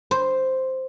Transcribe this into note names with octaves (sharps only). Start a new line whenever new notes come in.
C5